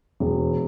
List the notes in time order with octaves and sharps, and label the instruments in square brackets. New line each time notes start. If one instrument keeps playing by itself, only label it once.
[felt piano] E1